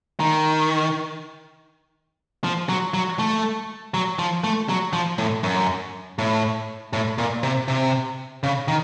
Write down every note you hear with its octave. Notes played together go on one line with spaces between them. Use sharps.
D#3
F3
F#3
F#3
A3
F#3
F3
A3
F#3
F3
A2
F#2
A2
A2
A#2
C3
C3
C#3
D#3